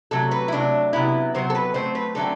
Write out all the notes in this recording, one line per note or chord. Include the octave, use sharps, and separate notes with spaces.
C3 F#3 A3 A4
B4
E4
C3 F#3 A3 D4
C3 F#3 B3 E4
C3 F#3 B3 C5
A4
B4
D3 F#3 A3 C4 C5
B4
D3 F#3 A3 C4 A4